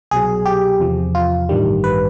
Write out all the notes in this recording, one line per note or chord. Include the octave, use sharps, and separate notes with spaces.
C2 B2 F#3 G#4
G4
E2 C3 F3
F4
A1 G2 D#3 G3
B4